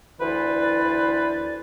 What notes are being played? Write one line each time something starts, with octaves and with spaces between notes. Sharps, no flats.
D2 E3 E4 B4 C5 D5